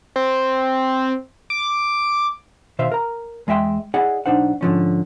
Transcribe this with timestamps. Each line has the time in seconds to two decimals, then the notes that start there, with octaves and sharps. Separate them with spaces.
0.16 C4
1.50 D6
2.79 B2 D#3 C5 E5 F5
2.92 A#4 A#5
3.47 E2 G#3 D#5 E5 G5 C6
3.94 E4 G#4 D5 D#5 F#5
4.26 B1 G2 D4 D#4 C5 F#5
4.61 G#2 D3 F3 C#4